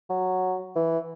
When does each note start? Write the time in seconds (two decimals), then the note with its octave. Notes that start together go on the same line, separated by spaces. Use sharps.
0.10 F#3
0.76 E3